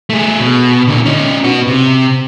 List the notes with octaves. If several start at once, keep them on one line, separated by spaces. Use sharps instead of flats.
A3 G#4
B2
A#2 D3
C#4 D#4
B3 F#4
C3